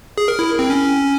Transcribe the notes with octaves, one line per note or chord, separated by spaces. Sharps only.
G#4
A#4
E4
C4
C#4